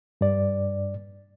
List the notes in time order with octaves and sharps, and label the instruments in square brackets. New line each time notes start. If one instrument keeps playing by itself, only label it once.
[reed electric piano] G2 D5